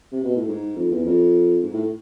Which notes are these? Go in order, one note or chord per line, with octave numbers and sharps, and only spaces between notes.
C3
B2
A2
G#2
F2
E2
F2
G#2
A2